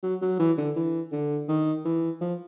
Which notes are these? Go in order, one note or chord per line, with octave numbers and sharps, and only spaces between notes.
F#3
F#3
E3
D3
E3
D3
D#3
E3
F3